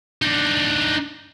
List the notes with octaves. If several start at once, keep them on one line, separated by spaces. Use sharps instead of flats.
D4 D#4